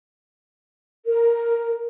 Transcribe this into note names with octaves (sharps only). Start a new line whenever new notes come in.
A#4